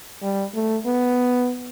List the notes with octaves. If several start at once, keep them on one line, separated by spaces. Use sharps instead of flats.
G3
A3
B3